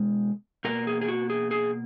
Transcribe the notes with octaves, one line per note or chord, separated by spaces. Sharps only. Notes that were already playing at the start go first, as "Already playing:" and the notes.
Already playing: B2 G#3
B2 A#3 A#4
G#4
G#4
F#4
G#4
G#4